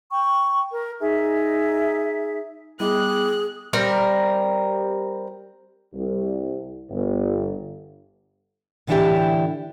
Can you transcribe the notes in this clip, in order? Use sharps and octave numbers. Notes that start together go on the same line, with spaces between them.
G5 C#6
A#4
D#4 G#4 E5
G3 B3 E4 G#4 D#5 G5 D6 F#6
G3 C4 A#4
C2
G1
A2 D3 E3 D4 E4 G4